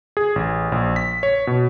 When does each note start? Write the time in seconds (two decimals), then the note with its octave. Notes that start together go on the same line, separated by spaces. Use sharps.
0.17 G#4
0.36 A1
0.72 A#1
0.96 B6
1.23 C#5
1.47 B2